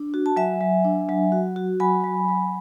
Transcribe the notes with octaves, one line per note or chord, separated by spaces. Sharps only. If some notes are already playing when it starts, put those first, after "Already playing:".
Already playing: D4
F#4
A5
F#3 E5 G#5
F#3
D4
F#3
F#4
F#4
F#3 G#5 B5
F#3
F#3